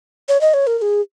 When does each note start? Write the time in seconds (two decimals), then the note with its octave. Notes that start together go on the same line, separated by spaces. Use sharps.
0.29 C#5
0.41 D#5
0.54 C#5
0.67 A#4
0.78 A#4
0.82 G#4